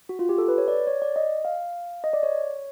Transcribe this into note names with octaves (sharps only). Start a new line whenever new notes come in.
F#4
F4
G4
A4
B4
C#5
D5
C#5
D5
D#5
F5
D#5
D5
C#5